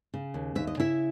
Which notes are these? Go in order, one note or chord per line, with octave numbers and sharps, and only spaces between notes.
C#3
D#2
D#2 E5
D#5
C#3 E4 E5